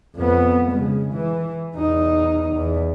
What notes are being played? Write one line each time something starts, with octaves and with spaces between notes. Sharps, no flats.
F2 B3
C#3 G#3
E3
E2 D#4
E2